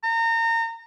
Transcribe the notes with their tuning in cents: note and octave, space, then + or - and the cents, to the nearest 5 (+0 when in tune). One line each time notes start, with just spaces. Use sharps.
A#5 -30